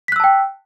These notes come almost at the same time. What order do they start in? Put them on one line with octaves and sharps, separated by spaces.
B6 F#6 E6 A5 G5